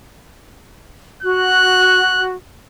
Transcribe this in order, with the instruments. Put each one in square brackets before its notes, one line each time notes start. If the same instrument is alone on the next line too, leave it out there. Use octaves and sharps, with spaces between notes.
[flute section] F#4 [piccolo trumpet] F#6